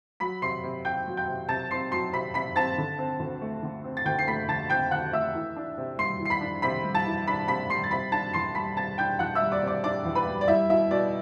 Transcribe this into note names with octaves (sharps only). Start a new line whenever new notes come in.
F#3 B5 B6
C3 C6 C7
C3
C4 G5 G6
F#3
G5 G6
C3
C3 A5 A6
C4 C6 C7
F#3 C6 C7
C3 B5 B6
C3 B5 B6
C4 A5 A6
D3
C4
D2
A3
D3
C4
A6
D2 G5 G6
C7
A3 B5 B6
D3 A5 A6
C4 G5 G6
D2 F#5 F#6
A3 E5 E6
E3
D4
C3
G3 C6 C7
E3
C7
B5 B6
D4
C3 B5 B6
G3
A5 A6
E3
D4 B5 B6
C3 B5 B6
G3 C6 C7
A6
C3 B5 B6
D4 A5 A6
E2 C6 C7
G3 B5 B6
C3 A5 A6
D4 G5 G6
E2 F#5 F#6
E5 E6
G3
D5 D6
C3 D5 D6
D4 D5 D6
E2
B4 B5
G3
D5
G3 E4 E5
B2 E4 E5
B2 D5